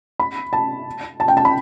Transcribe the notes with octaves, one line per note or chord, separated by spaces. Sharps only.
B5
A5
A5
G5
A5
B5